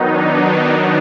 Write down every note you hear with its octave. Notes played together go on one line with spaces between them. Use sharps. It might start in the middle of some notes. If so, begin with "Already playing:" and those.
Already playing: D#3 F#3 B3 D#4
D4